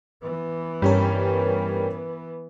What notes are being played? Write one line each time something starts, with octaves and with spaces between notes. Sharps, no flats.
E3 B3
G2 G3 C#4 A#4